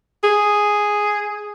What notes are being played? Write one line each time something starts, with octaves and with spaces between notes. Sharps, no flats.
G#4